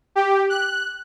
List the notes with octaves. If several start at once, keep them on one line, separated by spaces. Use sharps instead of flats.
G4
F#6